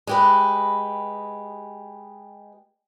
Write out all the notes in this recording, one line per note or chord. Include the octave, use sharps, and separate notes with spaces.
G#3 G4 B4